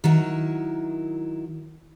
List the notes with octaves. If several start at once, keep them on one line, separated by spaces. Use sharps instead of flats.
D#3 F#3 E4